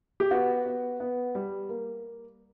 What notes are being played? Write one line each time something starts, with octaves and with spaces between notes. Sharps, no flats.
G4
B3 F#4
B3
B3
G3
A#3